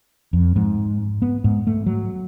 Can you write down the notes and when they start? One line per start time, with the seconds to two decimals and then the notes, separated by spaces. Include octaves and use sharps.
0.33 F2
0.56 G#2
1.22 B3
1.44 G#2
1.67 A3
1.86 F#3